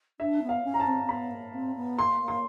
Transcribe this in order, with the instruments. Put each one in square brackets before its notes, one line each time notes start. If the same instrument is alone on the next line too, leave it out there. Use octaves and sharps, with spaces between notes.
[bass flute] D4 [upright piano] E5
[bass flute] B3
[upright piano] F5
[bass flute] C#4
[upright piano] A#5
A5
[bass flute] C4
C4
[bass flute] B3 [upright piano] B5
[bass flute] A#3
C4
B3
[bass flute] A#3 [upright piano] C6
[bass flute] A#3
[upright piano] C6